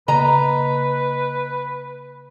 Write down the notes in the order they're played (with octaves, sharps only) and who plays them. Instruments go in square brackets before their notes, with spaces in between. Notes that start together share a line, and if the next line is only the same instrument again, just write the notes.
[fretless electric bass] C#3 A#3 [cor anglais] B4 [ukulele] D#5 A#5